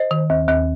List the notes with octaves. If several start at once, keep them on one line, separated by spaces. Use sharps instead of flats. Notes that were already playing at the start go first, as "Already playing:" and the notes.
Already playing: C5 D#5
D#3
D#2
D#2